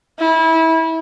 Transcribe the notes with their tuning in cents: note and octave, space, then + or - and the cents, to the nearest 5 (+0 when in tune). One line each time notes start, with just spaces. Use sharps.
E4 -25